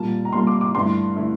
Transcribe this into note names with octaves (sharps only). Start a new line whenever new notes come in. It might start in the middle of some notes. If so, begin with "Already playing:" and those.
Already playing: A#2 G3 A#3 A5
A#5
A#2 G3 A#3 C6
D6
D6
G2 D3 A3 E4 C6
D3 A3 E4